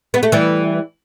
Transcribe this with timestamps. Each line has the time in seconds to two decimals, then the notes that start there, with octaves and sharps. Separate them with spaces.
0.14 B3
0.23 A3
0.32 E3 G3